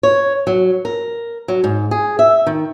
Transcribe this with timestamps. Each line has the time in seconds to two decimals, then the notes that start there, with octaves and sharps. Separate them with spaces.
0.03 C#5
0.47 F#3
0.85 A#4
1.48 F#3
1.64 G#2
1.91 G#4
2.19 E5
2.47 D#3